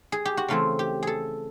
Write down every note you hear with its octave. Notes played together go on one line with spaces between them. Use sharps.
G#4
G4
F#4
C#3 E3 A3 C4 F4
G4
G#4 A4